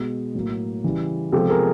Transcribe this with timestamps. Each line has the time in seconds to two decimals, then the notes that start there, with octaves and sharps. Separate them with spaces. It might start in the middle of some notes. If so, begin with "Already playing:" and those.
Already playing: B2 G#3 B3
0.35 A2 F#3 A#3
0.84 C#3 E3 G3
1.32 C3 F3 G#3 B3 G4 A4
1.49 G#4 A#4